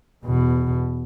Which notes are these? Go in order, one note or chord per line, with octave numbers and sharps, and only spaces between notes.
E2 B2